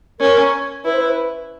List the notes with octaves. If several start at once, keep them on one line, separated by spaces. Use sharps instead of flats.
C#4 A#4
E4 B4
C5
B4